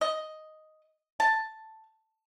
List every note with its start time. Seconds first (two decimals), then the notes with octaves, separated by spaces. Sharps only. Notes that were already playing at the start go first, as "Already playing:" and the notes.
0.01 D#5
1.20 A5